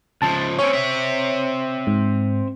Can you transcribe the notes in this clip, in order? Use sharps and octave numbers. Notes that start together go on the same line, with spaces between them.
C#2 F3 A5
C4 C#4 C#5
C4 E5
G#2